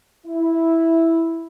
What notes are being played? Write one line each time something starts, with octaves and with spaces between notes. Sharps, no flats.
E4